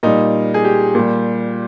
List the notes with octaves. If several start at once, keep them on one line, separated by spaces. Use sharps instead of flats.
A#2 G3 D#4
G#4
G4
A#2 G3